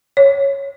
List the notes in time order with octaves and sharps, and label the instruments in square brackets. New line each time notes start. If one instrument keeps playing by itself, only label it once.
[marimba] C#5